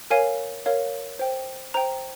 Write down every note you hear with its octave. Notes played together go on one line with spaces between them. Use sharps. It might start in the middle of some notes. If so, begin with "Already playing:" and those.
A#4 C#5 F5 G#5
A#4 C#5 F5
C5 G5
C5 G5 A#5